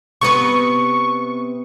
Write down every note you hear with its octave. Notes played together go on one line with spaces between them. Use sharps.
C3 B3 B4 C#6